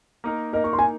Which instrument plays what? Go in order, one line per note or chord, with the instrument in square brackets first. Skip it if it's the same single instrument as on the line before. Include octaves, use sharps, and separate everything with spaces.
[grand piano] A#3 D#4 A#4
[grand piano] A#3 D#4 A#4 [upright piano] D#5
[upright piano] C#6
C6
G#5